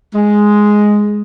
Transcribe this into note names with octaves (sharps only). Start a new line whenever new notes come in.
G#3